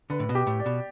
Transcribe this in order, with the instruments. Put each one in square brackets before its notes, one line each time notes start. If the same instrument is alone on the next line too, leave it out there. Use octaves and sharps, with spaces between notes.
[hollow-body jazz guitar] D3 [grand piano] B4
[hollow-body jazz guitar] A2
B2
[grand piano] G4
[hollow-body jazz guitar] A2
[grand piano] D5
[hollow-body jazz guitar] B2